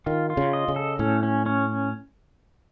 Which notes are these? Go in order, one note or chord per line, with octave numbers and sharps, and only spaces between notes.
D#3 F4
F4
C#3
D#5
C#3
A4
A2 C#4
C#4
C#4